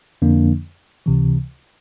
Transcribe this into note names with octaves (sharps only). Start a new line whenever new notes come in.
F2 D3 F3 A#3 D4
C#2 C3 E3